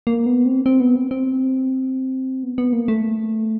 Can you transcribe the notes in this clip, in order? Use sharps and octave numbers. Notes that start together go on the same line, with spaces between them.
A#3
B3
C4
C4
B3
C4
C4
B3
B3
A#3
A3